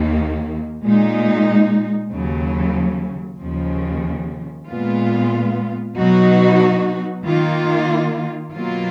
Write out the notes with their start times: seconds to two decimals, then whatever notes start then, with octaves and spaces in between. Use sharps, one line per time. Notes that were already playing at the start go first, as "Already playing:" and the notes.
Already playing: D#2 D#3 A#3
0.83 A#2 G#3 D#4
2.12 D#2 C#3 F#3
3.40 D#2 C#3 F3
4.68 A#2 G#3 B3 F4
5.96 B2 F#3 B3 D#4 F#4
7.25 D#3 A#3 F4
8.53 B2 F#3 A#3 F4